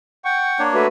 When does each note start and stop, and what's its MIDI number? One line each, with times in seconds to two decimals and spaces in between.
0.25 0.62 78
0.25 0.62 79
0.25 0.62 85
0.59 0.86 58
0.59 0.86 62
0.59 0.86 73
0.74 0.87 57
0.74 0.87 66
0.74 0.87 71